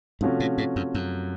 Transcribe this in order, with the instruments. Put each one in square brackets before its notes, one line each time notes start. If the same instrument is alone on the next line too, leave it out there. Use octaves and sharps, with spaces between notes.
[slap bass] G#2 [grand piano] C3 F3 A3 C#4 F#4
[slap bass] A2
G#2
F#2
F#2